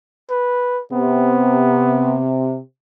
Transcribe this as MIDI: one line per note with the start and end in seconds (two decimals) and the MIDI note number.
0.30 0.82 71
0.93 2.58 48
0.93 2.22 59